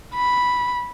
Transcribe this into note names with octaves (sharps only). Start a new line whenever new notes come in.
B5